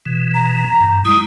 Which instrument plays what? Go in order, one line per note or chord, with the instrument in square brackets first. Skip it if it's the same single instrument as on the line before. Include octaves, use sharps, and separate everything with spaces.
[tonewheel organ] B2 E3
[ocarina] A#5
[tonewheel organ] G2
[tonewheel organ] G3 G#3 E4 [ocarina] D#6